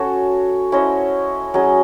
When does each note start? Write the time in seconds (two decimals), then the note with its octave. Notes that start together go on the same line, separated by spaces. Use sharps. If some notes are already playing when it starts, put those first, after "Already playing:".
Already playing: C#4 F#4 A4
0.72 C#4 E4 C5 D#5
1.54 F#3 C#4 G#4 D#5